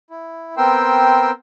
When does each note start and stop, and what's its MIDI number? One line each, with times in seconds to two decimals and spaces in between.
0.10 0.55 64
0.57 1.31 59
0.57 1.31 60
0.57 1.31 70
0.57 1.31 79
0.57 1.31 84
0.57 1.31 88